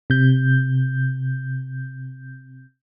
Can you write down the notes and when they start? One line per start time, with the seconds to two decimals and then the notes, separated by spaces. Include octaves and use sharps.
0.10 C3 G6